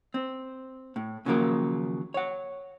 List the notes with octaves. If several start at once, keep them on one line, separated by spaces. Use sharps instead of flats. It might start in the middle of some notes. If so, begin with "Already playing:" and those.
C4
A2
D#2 C#3 F3 F#3 A#3 A#4
C#5 F#5